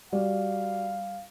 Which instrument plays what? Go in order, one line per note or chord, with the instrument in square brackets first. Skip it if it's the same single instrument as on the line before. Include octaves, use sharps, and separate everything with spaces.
[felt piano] G3 [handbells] F#4 D5 [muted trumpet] F5